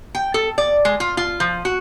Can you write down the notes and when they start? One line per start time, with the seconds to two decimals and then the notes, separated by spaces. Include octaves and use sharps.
0.15 G5
0.34 A4
0.58 D5
0.85 G#3
1.00 F4
1.17 F4
1.40 F3
1.65 F#4